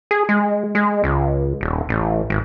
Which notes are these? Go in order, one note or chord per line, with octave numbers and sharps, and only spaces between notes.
G#4
G#3
G#3
C#2
D#1
A1
G#1